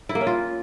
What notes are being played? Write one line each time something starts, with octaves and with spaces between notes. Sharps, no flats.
E4
A#3
C#4
F4